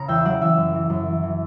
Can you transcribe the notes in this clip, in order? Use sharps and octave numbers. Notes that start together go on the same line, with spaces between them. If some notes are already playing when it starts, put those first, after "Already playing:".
Already playing: C#3 A#5
E2 E5 G5
F#3 D5 F#5
E3 E5
F#2
E3
F#2
E3
E3